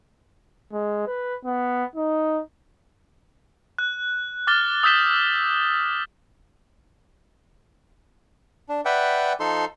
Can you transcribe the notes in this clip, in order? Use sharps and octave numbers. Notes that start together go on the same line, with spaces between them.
G#3
B4
B3
D#4
F#6
D6 F6 A6 G7
D#6 E6 G6 B6 E7 G7
D4
B4 D5 E5 F#5 G5
F3 D#4 A4 C6